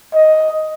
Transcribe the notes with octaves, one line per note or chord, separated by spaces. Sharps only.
D#5